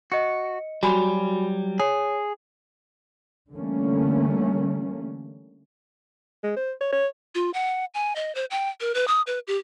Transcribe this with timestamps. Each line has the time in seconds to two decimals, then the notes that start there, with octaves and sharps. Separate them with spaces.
0.12 F#4 D#5 C#7
0.83 F#3 G3 F#4 G#5 B5
1.80 G#4 C#5
3.53 D3 E3 G3 A3 A#3 C#4
6.44 G#3
6.56 C5
6.81 C#5
6.93 C#5
7.35 F4
7.54 F#5
7.94 G#5
8.16 D#5
8.35 C5
8.51 G5
8.81 A#4
8.95 B4
9.08 D#6
9.27 B4
9.47 G4